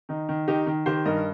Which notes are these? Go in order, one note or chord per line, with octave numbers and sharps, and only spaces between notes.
D#3 D#4
D#3
D#3 D#4 G4
D#3
D#3 G4 C5
G2 A#4 D#5